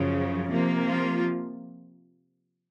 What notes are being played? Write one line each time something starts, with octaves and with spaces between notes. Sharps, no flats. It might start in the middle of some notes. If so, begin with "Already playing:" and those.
Already playing: F#2 C#3 F3
C3 F3 A#3
F3 F4